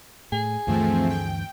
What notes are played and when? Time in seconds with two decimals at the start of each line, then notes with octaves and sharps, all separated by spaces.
0.32 A2 G#4
0.67 D2 G2 E3 F3 A3 C4
1.09 G5